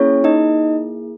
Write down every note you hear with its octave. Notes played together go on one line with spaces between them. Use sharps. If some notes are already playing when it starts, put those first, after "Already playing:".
Already playing: A#3 C#4 E4 G#4 C#5
D#4 D#5